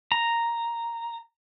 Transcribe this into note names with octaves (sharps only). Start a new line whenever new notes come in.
A#5